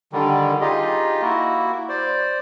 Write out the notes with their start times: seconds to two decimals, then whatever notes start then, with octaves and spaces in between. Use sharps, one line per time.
0.12 D3 D#3 G3
0.61 D#4 F4 G4 G#4 D#5
1.22 A#3 E4 F#4
1.89 C5 D5